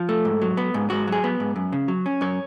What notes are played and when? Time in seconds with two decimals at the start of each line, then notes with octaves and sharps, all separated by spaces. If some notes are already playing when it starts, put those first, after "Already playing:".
Already playing: F3
0.09 A3
0.25 G#2
0.41 F#3
0.57 B3
0.74 G#2
0.90 G#2 F#4
1.07 F#3 G#4
1.24 B3
1.40 G#2
1.56 F#2
1.72 C#3
1.88 F#3
2.06 C#4
2.21 F#2 C#5